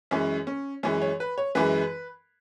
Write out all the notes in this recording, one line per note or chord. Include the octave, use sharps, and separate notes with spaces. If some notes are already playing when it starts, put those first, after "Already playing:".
F#2 E3 G#3 C#4
C#4
F#2 E3 G#3 C#4
C#5
B4
C#5
F#2 E3 G#3 B4